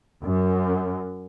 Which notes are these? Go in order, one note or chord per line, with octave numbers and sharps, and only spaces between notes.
F#2